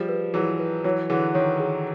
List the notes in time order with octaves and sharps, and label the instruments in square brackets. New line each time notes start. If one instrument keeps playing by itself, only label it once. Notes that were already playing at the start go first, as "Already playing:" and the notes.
Already playing: [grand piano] F3 G3 [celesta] G#4
[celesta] B4
[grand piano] E3 F#3 [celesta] G#4
[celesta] B4
[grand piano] E3 F#3 [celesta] C#5
[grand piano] D3 E3 [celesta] G#4
[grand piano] D#3 [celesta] C#5
[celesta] G#4